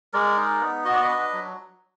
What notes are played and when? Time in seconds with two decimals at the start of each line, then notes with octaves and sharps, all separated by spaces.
0.13 G#3 A#4 D5
0.37 D#4
0.61 B3
0.85 F#4 D#5
0.93 D5
1.02 B4 D#5
1.08 D4
1.33 F#3